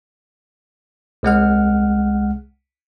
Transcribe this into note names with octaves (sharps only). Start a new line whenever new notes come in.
C2 G#3 F#5 F6